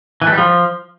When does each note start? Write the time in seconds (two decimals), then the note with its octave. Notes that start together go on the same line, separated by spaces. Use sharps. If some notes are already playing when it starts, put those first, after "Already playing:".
0.22 E3
0.27 A3
0.32 G3
0.38 F3